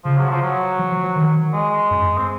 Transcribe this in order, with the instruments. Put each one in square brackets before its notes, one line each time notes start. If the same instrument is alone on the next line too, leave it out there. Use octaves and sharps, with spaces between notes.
[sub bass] C#3 [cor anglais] F3
[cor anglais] F#3
F3
F#3
[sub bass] F3
F3
F3
D#3
[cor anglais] G#3
[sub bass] F#2
[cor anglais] C4